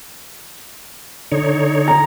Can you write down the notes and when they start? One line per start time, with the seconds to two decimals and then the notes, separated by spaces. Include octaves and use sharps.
1.32 D3 D#4 C#5
1.88 A#5